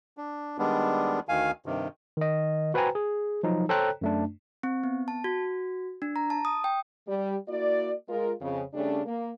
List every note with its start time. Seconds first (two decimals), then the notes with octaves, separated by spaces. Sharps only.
0.17 D4
0.58 D#3 G3 G#3 B3 D4
1.29 D2 D#3 F5 G#5
1.66 G2 C3 D#3
2.17 D#3 D#5
2.74 F#4 B4 C5 G5 G#5 A#5
2.95 G#4
3.43 F3 F#3 D#4
3.69 A4 C5 C#5 G5 A#5 F#6
4.01 F#2 A3 D4
4.63 C4
4.84 B3
5.08 A5
5.24 F#4
6.02 D4
6.16 A#5
6.30 A5
6.45 D#6
6.64 G5
7.06 G3
7.48 A#3 E4 F#4 D5
8.08 G#3 F4 A#4
8.41 F2 C#3
8.74 C#3 G3 A3 C#4 D4
9.06 A#3